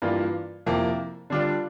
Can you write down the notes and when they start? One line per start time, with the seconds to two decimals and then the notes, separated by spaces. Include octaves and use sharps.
0.02 G2 E3 A#3 F4
0.66 F2 C3 F3 A#3 E4
1.30 D3 G3 D4 F4